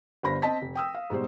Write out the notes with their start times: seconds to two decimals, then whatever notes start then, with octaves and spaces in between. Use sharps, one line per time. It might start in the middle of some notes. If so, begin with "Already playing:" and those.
0.23 G1 G2 C5 B5 A#6
0.42 C4 D#5 A5 B6
0.62 F1
0.75 G5 D#6 E6
0.95 F5
1.10 G#2 B2 G3 C5